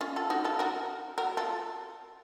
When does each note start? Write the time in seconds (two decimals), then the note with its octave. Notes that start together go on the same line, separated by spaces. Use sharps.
0.01 C#4 F4
0.16 F4 A4
0.30 D#4 F#4
0.44 F4 A4
0.59 F#4 A#4
1.18 F#4 A#4
1.37 F4 A4